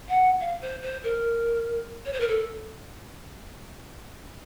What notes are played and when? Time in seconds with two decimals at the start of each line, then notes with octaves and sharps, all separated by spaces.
0.09 F#5
0.40 F5
0.61 C5
0.82 C5
1.03 A#4
2.05 C#5
2.12 C5
2.20 A#4
2.28 A4